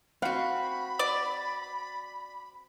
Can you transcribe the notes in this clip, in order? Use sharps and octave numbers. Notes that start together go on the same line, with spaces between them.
C4 F#4 F5 F#5 B5
D5